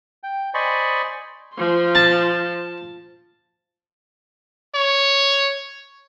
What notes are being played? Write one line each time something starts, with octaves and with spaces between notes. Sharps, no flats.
G5
C5 D5 D#5 G#5 B5 C#6
F3 C6
A5
C#5